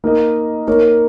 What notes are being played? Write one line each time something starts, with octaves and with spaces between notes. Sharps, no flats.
A#3 D#4 A#4 D#5
A#3 D#4 A#4 C#5